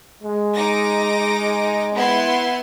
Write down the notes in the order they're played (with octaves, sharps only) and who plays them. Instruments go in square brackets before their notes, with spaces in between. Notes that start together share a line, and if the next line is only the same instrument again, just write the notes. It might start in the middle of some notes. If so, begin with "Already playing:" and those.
[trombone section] G#3
[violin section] D#4 D6 A#6
B3 E4 C6